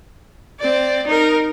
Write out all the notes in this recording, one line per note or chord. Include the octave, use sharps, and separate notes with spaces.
C4 D5
D#4 A#4